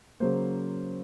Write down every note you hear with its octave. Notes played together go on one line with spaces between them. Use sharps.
C#3 F#3 A#3 C5